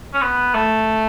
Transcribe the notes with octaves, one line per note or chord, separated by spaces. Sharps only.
C#4
B3
A3